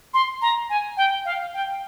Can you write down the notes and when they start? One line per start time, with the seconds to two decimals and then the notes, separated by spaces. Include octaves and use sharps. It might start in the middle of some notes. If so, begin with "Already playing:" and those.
0.14 C6
0.42 A#5
0.70 G#5
0.97 G5
1.25 F5
1.54 G5